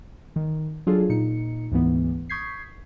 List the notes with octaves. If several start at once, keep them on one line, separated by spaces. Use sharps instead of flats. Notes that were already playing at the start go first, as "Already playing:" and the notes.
D#3
F#3 D4 F4 G#4 A4
A#2 D#4 C#7
D2 G#2 E3 B3
C#6 D#6 G6 G#6 B6 C7